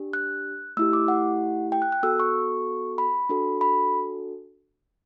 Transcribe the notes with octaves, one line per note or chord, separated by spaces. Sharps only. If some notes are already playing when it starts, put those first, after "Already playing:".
Already playing: D4 G4
F#6
A3 E4 G4 E6
D6
F#5
G5
F#6
F#6
B3 F#4 A4 E6
C#6
B5
D4 F#4 A4
B5